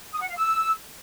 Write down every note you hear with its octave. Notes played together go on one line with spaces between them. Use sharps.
D#6
F#5
F5
E6